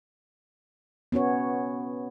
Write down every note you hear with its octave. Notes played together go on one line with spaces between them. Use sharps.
B3 C#4 F#4 C#5